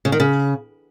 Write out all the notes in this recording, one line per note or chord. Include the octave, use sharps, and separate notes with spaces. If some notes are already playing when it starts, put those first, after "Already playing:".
C#3
D#3
C#3